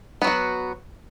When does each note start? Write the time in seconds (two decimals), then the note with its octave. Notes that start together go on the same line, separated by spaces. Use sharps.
0.22 B3
0.24 F#3
0.27 F#4